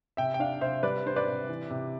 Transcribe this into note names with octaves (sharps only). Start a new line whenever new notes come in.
C3 E5 G5
G5
D4 D5 F5
C3 C5 E5
G3 B4 D5
D4 C5
B4 D5
C3
E3
C3